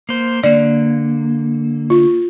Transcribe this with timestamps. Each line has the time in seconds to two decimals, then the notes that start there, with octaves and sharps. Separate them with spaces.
0.09 A#3 C5
0.44 D3 A#3 D5
1.90 F4